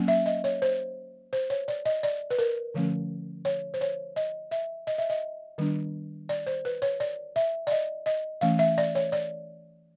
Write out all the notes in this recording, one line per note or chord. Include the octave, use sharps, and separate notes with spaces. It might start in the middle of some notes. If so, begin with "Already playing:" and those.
Already playing: F#3 A#3 C#4
E5
D#5
C#5
C5
C5
C#5
D5
D#5
D5
B4
A#4
D3 F3 A3 C#4
C#5
C5
C#5
D#5
E5
D#5
E5
D#5
D#3 G3 B3 D4
D5
C5
B4
C#5
D5
E5
D5
D#5
D#5
E3 A3 C#4 F5
E5
D5
C#5
D5